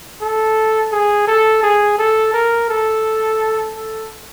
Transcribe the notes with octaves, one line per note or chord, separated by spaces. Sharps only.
A4
G#4
A4
G#4
A4
A#4
A4
A4